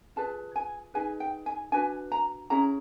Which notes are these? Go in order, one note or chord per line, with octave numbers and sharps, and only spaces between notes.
F4 G#4 B4 A5
G#5
D#4 G#4 B4 G#5
G5
G#5
D4 F#4 B4 G#5
A#5
C#4 E4 G#4 A#5